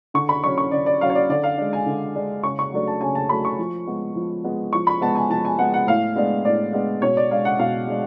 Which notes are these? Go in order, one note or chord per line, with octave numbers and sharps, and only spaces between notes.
D3 C#6
B5
F#3 C#4 C#6
C#6
D3 D5
D5
F#3 C#4 F5
C#5
D5
D3 D5
F5
G#3 D4
G#5
D3
G#3 D4
C#3 C#6
C#6
F#3 A3 D4
A5
C#3 G#5
A5
F#3 A3 D4 B5
C#6
F3
G#3 B3
F3
G#3 B3
F3 C#6
B5
G#3 B3 A5
G#5
F3 A5
G#5
G#3 B3 F#5
F#5
A2 F5
G#3 B3 D4
A2 D5
G#3 B3 D4
B2 C#5
D5
G#3 D4 F5
F#5
B2 F5
G#3 D4